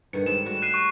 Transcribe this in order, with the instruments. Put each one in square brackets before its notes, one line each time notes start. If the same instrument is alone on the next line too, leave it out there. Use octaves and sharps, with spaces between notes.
[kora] G2 D3 D#3 [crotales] C#7
[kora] G#2 G3 G#4 [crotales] E7
[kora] G3 A3 F#4
[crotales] F#6 C7 D#7
C#6